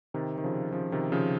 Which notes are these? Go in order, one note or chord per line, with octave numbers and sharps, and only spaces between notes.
C3 D#3
D#3
C#3 F3
C#3 F3
C3 D#3
C#3 F3